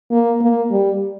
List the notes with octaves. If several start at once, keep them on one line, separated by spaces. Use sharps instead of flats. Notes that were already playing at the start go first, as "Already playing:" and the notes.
A#3
A#3
G3